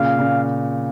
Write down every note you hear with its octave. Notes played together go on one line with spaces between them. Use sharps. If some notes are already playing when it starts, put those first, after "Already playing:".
Already playing: A#2 C#3 F5
A#2 C#3